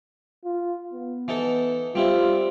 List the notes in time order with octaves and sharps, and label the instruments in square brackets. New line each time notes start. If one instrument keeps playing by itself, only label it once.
[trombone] F4
B3
[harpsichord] E3 D#4 A4
[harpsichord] G3 C4 E4 [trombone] F4